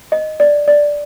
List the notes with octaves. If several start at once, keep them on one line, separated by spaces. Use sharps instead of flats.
D#5
D5
D5